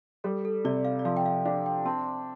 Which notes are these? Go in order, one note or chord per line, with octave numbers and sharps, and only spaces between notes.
G3 A4
A4
C3 D5
F5
D5
F3 F5
G5
F5
D4 F5
G5
C4 A5